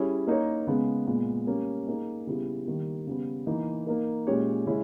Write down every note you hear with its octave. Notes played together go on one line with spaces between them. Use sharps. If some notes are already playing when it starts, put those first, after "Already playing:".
Already playing: G3 C#4 E4 G#4 C#5
A#3 D#4 A#4 C#5
C#3 G#3 B3
A#2 G#3 B3
G3 A#3 C#4
A#3 D#4 G#4
C#3 G3 B3 E4 G#4
D#3 G3 A#3
C#3 G3 B3
E3 A#3 D#4
A#3 D#4 A#4
A#2 G#3 C#4 G4 C#5
C#3 G#3 C#4 E4